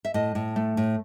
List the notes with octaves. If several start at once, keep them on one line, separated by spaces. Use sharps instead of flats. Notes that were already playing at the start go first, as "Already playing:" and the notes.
E5
A2 D#5
A2
A3
A2